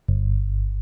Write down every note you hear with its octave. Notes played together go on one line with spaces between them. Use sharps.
G1